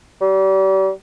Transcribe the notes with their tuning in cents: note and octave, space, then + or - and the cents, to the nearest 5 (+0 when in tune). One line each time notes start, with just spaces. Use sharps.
G3 -35